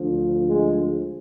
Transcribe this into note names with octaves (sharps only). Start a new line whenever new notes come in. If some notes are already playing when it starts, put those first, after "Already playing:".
Already playing: D2 D3 F3
G#3